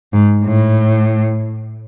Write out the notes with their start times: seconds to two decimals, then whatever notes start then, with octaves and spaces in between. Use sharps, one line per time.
0.13 G#2
0.45 A2